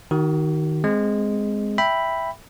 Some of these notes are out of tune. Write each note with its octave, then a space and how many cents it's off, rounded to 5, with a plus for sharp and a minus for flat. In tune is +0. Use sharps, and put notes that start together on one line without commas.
D#3 +0 F#4 +40
G#3 +0 C4 -5
E5 +0 G5 +5 B5 +0